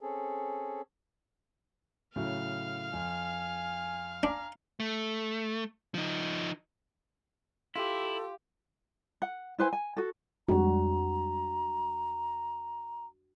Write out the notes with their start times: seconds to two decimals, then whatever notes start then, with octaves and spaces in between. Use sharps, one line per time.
0.01 C4 C#4 G#4 A4
2.16 A2 C#3 F#3 F5 F6
2.93 F2 G#5
4.23 D4 G#5 A#5
4.80 A3
5.94 F3 D#4
7.76 E4 F4 G4 A4
9.22 F#5
9.59 E4 B4 C5 G#5
9.73 G#5
9.97 F#4 A4
10.49 F2 G3 G#3 D4 F#4 A#5